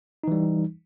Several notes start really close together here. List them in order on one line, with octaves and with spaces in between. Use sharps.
D#4 E3 G3